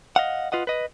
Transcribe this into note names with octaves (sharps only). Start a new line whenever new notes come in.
D#5 F5 F#5
F4 B4 D#5 F#5
B4 D#5